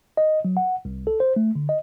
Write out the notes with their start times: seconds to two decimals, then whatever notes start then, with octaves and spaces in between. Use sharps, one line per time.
0.17 D#5
0.45 F#3
0.57 F#5
0.85 C2
1.07 A4
1.20 C5
1.36 A3
1.55 D3
1.69 D#5